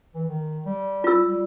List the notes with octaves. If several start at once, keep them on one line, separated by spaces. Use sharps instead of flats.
E3
D#3
G3
F4 E6
G3